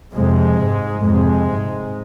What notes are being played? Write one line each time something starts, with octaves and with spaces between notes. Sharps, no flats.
F2 C3 G#3
G#2
F2 C3 G#3
G#2